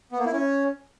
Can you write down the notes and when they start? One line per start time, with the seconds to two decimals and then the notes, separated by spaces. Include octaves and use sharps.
0.12 B3
0.19 A#3
0.26 E4
0.32 C#4